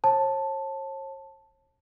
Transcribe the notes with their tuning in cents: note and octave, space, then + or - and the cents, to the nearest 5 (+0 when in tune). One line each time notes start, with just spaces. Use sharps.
C#5 -45 A5 +0